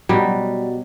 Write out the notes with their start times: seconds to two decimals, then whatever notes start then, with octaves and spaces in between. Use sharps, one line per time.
0.09 B2 F#3 G3